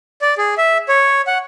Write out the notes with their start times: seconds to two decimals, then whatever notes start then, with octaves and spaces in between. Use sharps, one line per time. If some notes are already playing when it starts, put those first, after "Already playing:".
0.22 D5
0.38 G#4
0.58 E5
0.88 C#5
1.27 F#5